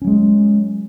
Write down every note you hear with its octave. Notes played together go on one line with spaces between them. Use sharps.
F#3 G#3 C#4